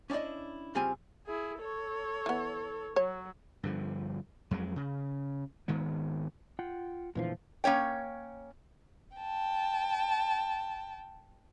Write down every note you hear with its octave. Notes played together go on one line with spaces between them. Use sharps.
C#4 D4 E4 D5 D#5
C#3 G3 C4 F4 G#5
E4 G#4
A4 C#5
E3 B3
F#3 C#5
G2 D3 F3
F2 F#3 G#3
C#3
G#1 D#3 G#3 B3
F4 F#5 G5
E1 A#2 D3 E3 F3 F4
A#3 C#4 C#5 G5
G5 A5